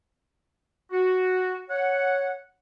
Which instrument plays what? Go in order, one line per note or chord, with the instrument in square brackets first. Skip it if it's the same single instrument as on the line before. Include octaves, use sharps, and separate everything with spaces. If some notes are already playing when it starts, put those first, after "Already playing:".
[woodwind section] F#4
C#5 F#5